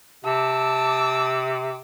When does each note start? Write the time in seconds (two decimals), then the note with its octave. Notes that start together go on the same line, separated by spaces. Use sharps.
0.25 C3 A5 D6 E6